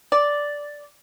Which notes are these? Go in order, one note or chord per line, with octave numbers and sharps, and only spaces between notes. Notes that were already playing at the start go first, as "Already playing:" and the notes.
D5